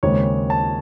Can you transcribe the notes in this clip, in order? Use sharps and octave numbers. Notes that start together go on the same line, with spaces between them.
D#2 C#3 G#3 C4 C#5
A5